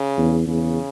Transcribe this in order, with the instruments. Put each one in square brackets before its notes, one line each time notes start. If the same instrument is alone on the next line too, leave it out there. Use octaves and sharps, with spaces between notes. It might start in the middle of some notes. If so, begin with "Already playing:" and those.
Already playing: [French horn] C#3
[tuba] E2
[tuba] E2 [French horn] C#3